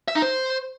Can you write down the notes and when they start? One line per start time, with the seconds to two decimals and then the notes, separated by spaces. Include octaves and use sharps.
0.08 E5
0.15 D#4
0.22 C5